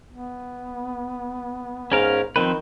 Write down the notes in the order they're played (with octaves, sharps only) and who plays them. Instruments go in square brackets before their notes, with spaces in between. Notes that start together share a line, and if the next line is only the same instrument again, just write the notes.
[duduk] B3
[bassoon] G#2 [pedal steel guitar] C#4 A#4 F5
[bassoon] D#3 [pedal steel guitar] F3 C4 B4